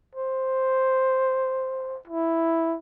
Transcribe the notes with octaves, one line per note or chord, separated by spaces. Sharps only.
C5
E4